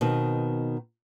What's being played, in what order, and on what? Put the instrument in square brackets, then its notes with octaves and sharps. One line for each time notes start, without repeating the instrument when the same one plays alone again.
[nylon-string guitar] B2 D#3 C4